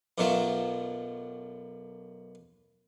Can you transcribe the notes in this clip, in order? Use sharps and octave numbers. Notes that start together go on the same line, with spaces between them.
B1 F#2 B2 F#3 F4 E5